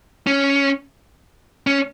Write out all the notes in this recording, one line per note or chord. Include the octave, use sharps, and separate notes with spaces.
C#4
C#4